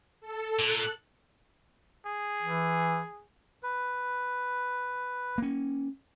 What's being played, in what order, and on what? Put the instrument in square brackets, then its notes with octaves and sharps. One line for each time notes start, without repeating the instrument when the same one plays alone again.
[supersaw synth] A4
[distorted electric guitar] A#2 [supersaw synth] F#6
[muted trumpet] G#4
[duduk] E3
[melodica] B4
[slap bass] A#3 C#4